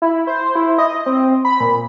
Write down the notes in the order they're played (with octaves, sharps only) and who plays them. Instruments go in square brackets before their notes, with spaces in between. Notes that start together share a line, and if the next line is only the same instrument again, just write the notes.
[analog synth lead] E4
C5
E4
D#5
C4
B5
A#2